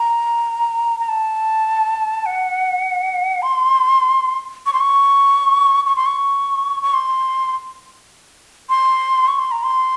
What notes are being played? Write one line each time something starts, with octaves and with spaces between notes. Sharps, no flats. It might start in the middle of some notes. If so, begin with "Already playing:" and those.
Already playing: A#5
A#5
A5
F#5
C6
C#6
C6
C#6
C#6
C6
C#6
C#6
C6
C6
C#6
C6
A#5
C6